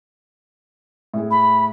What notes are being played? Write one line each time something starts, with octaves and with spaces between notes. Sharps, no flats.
A2 G#4
B5